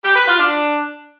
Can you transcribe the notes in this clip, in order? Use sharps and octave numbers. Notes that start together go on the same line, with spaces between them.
G4
B4
F4
D4